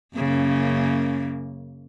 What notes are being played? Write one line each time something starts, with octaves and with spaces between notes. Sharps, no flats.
F#2 C#3 A#3